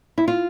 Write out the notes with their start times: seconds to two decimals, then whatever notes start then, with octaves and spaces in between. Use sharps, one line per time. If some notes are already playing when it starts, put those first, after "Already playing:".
0.18 E4
0.28 F4